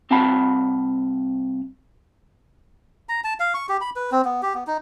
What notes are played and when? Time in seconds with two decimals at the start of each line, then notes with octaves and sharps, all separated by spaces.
0.10 C2 C4 F5 F#5 A5 B5
3.09 A#5
3.24 A5
3.40 F5
3.54 C#6
3.69 G4
3.81 B5
3.96 B4
4.12 C4
4.25 B3
4.42 G4
4.54 B3
4.67 D#4